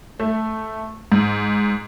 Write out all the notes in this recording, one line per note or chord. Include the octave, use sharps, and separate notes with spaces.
A3
G#2